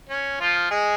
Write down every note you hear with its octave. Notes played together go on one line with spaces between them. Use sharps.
C#4
F3 F4
G#3 G#4